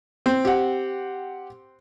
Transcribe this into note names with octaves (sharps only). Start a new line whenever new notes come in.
C4
G4 F#5